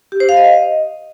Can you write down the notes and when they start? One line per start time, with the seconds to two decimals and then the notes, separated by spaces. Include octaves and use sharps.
0.12 G4
0.20 C5
0.29 F5
0.37 D#5